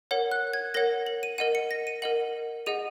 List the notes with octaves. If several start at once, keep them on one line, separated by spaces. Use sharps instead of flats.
A#4 C#5 F#5
F#6
G#6
A#4 C#5 F#5 A#6
F#7
D#7
A#4 D#5 F#5 D#7
C#7
A#6
D#7
A#4 D#5 F#5 F#7
G#4 D#5 F#5 D#7